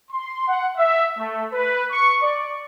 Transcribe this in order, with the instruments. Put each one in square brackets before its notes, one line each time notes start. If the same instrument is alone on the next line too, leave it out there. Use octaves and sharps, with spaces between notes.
[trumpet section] C6
F#5
E5
A3
B4
C#6
D5